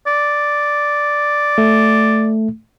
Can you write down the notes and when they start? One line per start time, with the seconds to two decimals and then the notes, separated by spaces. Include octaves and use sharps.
0.07 D5
1.58 A3